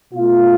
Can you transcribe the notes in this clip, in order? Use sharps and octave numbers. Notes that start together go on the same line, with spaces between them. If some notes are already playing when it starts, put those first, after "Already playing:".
B2 A3 F4